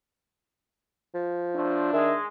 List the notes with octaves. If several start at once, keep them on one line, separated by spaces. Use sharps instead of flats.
F3
A2 D4 C5
D#3 G#3 E5